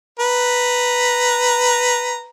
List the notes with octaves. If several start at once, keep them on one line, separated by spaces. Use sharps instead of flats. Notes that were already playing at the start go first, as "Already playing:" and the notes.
B4 A#5